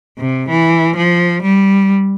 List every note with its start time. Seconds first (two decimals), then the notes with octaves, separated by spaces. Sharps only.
0.18 C3
0.49 E3
0.96 F3
1.43 G3